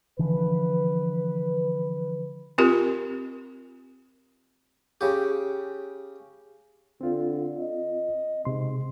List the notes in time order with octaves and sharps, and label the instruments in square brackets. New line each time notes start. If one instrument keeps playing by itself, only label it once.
[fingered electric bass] D3 E3 F3 [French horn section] B4
[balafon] C4 F4 G4 A#4
[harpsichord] C#3 G4
[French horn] D3 [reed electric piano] C4 F4
[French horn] D#5
[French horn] G#2 [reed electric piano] C3 C6